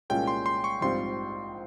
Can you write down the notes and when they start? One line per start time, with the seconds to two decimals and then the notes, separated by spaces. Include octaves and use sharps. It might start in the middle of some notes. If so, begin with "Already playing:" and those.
0.10 C2 A#2 G#3 C#4 F4 G5
0.28 C6
0.46 C6
0.64 C#6
0.81 A#1 G#2 G3 C4 F4 C6